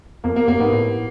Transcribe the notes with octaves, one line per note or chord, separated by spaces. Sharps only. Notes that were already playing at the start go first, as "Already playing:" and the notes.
F2 A#3
A#3
F#2 A#3
G#2 B3
A2